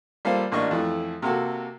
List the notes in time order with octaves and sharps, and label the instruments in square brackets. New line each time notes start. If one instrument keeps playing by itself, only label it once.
[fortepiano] G3 A#3 F4 A4 C5 F5
A1 A#3 D4 D#5 C#6
F2 E3 A3
C3 A#3 F#4 A4